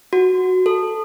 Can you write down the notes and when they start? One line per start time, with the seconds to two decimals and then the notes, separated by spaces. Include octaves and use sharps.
0.13 F#4
0.66 A4